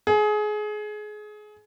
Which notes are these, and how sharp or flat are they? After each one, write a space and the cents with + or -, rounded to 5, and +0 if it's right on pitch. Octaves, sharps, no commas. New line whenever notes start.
G#4 +25